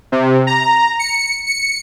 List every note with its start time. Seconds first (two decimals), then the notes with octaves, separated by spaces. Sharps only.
0.12 C3
0.47 A#5
0.99 C#7
1.46 C#7